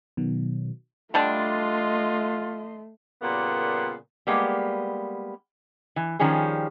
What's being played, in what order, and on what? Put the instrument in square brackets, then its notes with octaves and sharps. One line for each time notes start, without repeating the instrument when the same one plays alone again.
[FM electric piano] B2 D#3 F#3
[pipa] D3 G3 D4 [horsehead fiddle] A3 [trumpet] F4 [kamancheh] D#5 C6
[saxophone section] A#2 C#3 G3 A#3 B3
[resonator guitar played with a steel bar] G3 G#3 A#3 B3
E3
D#3 F3 G3 C#4 G#4